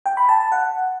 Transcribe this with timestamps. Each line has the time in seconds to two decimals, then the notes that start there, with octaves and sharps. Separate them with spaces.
0.06 G5
0.17 B5
0.29 A5
0.40 A5
0.52 F#5